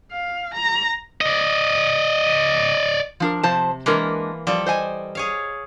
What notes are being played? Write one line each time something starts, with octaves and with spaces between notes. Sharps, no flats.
F5
A#5
D5 D#5
F3 D4 A#4
C3 F3 C5 A5
E3 G#3 A#3 D4 A#4
F3 G3 A4
C5 D#5 G#5
G#4 C#5 F5